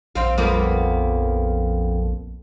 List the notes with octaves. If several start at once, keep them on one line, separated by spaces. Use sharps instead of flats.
A#1 C4 F5
F2 A#3 B3